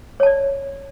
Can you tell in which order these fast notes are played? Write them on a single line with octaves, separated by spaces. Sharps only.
C#5 A5 D5